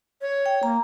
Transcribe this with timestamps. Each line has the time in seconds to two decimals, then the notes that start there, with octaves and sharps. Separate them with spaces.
0.21 C#5
0.46 G5
0.63 A#3 A#5